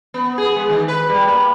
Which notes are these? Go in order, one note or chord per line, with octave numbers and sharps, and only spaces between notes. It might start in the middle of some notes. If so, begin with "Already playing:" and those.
B3
G#4
G#3
D#3
B4
G3
A#3